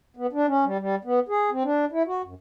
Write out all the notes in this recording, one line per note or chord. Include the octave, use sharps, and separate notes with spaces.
B3
D4
C#4
G3
G3
B3
G#4
C4
D4
E4
F#4
F#2